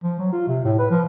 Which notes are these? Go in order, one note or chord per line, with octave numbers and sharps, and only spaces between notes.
F3
F#3
F4
C3
A2
B4
F3